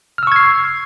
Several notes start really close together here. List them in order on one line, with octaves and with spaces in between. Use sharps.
F6 E6 C#6 G#6 C7